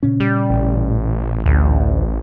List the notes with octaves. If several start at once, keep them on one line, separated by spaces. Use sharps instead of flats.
A#2 C#3 C#4
G3
A1
D2